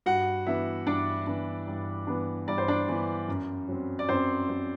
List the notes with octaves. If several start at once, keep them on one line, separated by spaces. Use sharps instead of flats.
G2 F#4 F#5
E3 B3 D4 E4 E5
G2 D4 D5
E3 B3 D4
G2
E3 B3 D4
G2 D5
C5
D4 D5
E3 B3 D4
F#2
F#3 C4
D5
F#2 C4 C5
F#3 C4